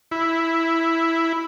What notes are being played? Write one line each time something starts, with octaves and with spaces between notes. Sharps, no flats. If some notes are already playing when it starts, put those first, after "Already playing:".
E4